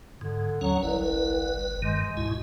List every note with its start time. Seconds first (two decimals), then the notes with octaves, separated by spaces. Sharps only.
0.21 G#2 D3
0.61 D#2 F#3 C#4 F#5
0.83 G1 C2 B4
1.82 G2 D#3 G#3
2.17 C#2 G#2 B2 E4